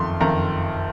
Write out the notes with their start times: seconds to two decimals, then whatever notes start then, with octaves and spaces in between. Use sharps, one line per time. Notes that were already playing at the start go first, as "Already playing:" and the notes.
Already playing: F#1 F2 D#3 C6
0.21 F#1 F2 D#3 A#5